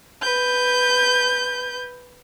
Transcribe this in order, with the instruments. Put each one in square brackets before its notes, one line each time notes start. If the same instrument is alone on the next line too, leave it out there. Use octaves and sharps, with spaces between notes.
[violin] B4 G6